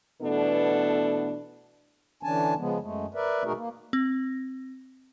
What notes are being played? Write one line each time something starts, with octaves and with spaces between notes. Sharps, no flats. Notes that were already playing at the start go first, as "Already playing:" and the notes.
B2 E3 A3 B3 D4 A4
D3 E3 C#4 D4 G#5 A5
C#3 F3 G#3 B3
F#2 G#3 A3
A#4 B4 D5 E5
B2 A3 D#4 F#4 G#4 A#4
A#3
C4